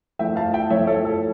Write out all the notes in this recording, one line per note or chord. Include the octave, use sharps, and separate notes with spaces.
F3 A3 E4 E5 G5
F5 A5
E5 G5
F3 A3 E4 C#5 E5
A4 C#5
A4